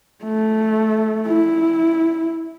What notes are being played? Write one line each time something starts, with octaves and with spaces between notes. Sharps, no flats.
A3
E4